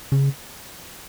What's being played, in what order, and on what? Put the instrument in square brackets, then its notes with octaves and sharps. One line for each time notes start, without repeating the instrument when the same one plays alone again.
[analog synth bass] C#3